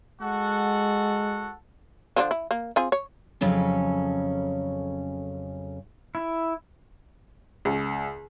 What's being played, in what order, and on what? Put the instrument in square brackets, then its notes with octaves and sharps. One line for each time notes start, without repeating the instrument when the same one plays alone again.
[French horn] G#3 [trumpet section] F#4 A4 F#5
[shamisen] D3 F3 D4
E4
A#3
C4 F4 G#4
C#5
[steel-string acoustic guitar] F2 C#3 F#3 C#4 A4
[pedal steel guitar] E4
[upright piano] C#2